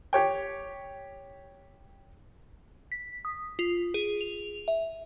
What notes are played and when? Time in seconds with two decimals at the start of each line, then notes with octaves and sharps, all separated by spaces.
0.13 G4 C#5 G5
2.92 B6
3.25 D#6
3.59 F4
3.94 G#4
4.21 F7
4.68 E5